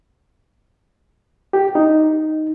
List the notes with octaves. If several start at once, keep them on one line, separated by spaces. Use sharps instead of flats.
G4
D#4